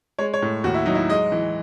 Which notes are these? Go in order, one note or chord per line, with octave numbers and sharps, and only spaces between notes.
G#3 C#5
C#5
A2
D#2 F#4
E4
F#3 D#4
E4
G#3 D#5
E3